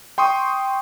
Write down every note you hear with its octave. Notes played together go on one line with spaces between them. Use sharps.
G5 C6 C#6 D#6